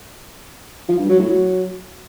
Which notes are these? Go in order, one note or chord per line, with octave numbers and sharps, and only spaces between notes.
F3
G2
F#3
A2
F#3